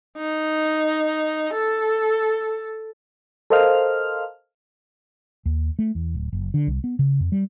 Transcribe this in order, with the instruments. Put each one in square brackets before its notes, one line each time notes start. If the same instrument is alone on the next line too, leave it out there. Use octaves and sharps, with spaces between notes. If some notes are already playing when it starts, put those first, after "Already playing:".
[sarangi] D#4
A4
[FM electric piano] A4 A#4 C5 D#5 F5 F6
[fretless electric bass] D#2
A3
E2
D1
F#1
D3
C2
B3
C#3
F2
G3